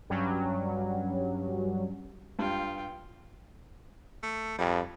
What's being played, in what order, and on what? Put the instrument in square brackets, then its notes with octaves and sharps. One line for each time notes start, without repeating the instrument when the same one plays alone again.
[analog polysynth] G2 F#3 G3 C#4
[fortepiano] G2 [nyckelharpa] F4 G5
[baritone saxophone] A3
[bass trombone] F2 [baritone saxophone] G3